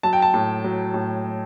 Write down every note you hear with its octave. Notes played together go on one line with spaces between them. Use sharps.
F#3 A5
G5
A5
A2
F#3
A2